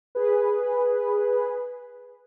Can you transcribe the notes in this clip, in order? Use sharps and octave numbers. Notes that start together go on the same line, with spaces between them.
G#4 B4